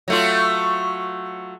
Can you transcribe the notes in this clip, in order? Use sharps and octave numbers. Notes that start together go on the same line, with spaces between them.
F#3 A3 F4